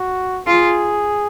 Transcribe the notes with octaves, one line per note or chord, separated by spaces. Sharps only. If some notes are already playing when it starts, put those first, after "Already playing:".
Already playing: F#4
F4 G#4